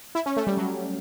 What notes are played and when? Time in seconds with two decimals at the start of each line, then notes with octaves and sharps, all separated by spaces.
0.15 E4
0.26 C#4
0.37 A3
0.47 G3
0.57 F#3